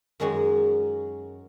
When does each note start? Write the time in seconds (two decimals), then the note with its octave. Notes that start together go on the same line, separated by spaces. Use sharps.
0.20 F#2 D#3 G#3 C#4 F#4